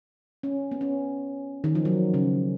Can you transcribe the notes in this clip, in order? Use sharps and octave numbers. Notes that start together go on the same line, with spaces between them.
C#4
B3
C#4
D#3
F3
F#3
C#3